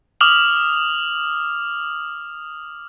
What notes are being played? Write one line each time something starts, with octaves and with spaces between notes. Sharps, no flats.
D6 D#6 F6 F7 F#7